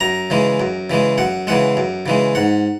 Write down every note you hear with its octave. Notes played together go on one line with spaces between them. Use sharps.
F#2 A#5
C#3 E3 G#3
F#2
C#3 E3 G#3
F#2 F#5
C#3 E3 G#3 F#5
F#2
C#3 E3 G#3
G#2 F#5